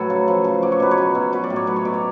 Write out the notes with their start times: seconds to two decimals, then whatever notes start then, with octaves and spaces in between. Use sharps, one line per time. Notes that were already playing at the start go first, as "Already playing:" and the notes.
Already playing: A2 F#3 A4 B4 C#5
0.10 C#3
0.28 F3
0.44 C#3
0.63 F#3 D5
0.72 C#5
0.80 B2 B4
0.91 C#5
0.98 F#3
1.15 B2
1.33 F#3 B4
1.44 D5
1.50 A2
1.56 C#5
1.67 F#3 B4
1.76 C#5
1.85 B2 D5
1.94 C#5